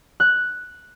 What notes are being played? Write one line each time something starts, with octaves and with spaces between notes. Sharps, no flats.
F#6